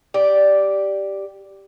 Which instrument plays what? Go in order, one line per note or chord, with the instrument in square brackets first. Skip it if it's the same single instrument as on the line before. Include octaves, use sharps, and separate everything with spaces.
[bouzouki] G4 D5